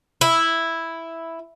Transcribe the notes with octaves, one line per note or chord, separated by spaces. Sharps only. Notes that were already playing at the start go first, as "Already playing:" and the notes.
E4